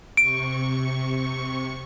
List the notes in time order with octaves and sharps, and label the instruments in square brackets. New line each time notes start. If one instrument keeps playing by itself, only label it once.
[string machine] C3 C#6 [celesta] D7